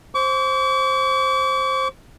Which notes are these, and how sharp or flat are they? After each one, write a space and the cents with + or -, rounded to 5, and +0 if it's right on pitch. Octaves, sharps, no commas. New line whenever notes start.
C5 +10 D6 -45